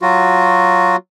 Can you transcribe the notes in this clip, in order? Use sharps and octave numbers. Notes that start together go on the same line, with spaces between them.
F#3 F4 F#4